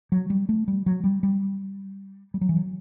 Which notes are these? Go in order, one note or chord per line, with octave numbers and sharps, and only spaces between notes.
F#3
G3
A3
G3
F#3
G3
G3
G3
F#3
E3
F#3